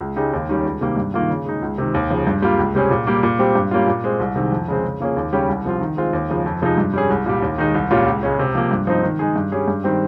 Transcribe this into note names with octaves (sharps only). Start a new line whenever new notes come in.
C#2
C#3 G#3 D#4 G4
D#2
D#3 G3 C#4
C#2
C3 D#3 G3 A#3
G2
D#3 A#3 F4
C#3
G#3 D#4
C#2
C3 D#3
D#2
C#3 F3
G2
G3 A#3 F4
C#2
C3 G3 C#4 G#4
A#2
G3 A#3
A#2
G3 C4 G4
G2
G3 A#3 C#4 F4
A#2
G#3 C4
C2
C3 D#3 G#3
F2
C#3 G#3 C4
C#3
F3 A#3 C#4 G#4
D#2
C#3 G3 C#4 G4
C2
C3 F3 C4 F4
D#3
G#3 C4 F4
D#2
C#3 F3 G#3
F2
C3 F3 G#3 D#4
G2
G3 C#4 G#4
C2
A#2 G3
D#2
D#3 G#3 D#4
C2
A#2 G3 C#4 F4
C#2
C#3 G#3 C#4
C3
F3 A#3
G2
F3 C4 D#4
D#3
G#3 D#4 G#4
G2
G3 C#4 G#4
G2
D#3 G3 C4 G4